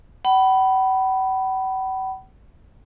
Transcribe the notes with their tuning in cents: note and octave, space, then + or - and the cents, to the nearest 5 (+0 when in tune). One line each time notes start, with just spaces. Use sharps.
F#5 +45 B5 +0